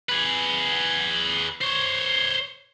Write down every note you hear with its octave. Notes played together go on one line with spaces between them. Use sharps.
G#4 B4
C5 C#5